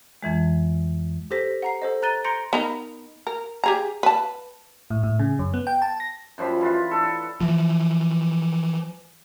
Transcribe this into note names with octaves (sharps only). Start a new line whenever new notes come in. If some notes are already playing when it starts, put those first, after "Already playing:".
F2 E3 G#3
G4 A4 C5 A#6 B6
F#5 A#5 C7
A4 C5 D#5
A#5 F#6 A6 D#7 G7
A#5 C6 G6 A#6 C#7 D7
B3 D#4 A#4
A#4
G4 G#4 A#5
B4 A5
A2
A2
C#3
F#2
B3
G5
A5
A#6
F#2 F3 G3 B5
E3 F4 B4
D4 A4
E3 F3